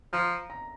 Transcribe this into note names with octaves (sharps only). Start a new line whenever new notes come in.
F3 A#5
A#5